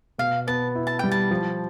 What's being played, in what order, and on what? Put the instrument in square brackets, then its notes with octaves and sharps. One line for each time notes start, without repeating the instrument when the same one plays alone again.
[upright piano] B2 [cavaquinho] F5
[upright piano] B3 [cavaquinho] A5
[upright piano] E4
[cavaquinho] A5
[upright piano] G3 [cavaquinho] G5
[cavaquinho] A5
[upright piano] F3